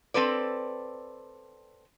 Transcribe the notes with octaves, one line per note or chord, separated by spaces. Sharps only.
C4 A4 B4 D5